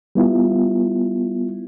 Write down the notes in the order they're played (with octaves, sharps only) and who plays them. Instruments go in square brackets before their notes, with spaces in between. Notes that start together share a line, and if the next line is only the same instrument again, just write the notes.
[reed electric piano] G3 B3 E4 F4